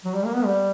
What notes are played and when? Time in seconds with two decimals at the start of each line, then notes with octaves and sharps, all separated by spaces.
0.05 F#3
0.15 G3
0.25 A#3
0.35 B3
0.45 G3